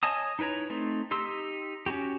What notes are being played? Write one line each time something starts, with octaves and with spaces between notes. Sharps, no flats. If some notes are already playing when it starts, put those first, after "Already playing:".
C#5 D#5 G#5 A5 D#6
D#4 E4 B4 C#5 A#5
A3 C4 D#4
D#4 G4 C6 E6
C#4 E4 F#4 G4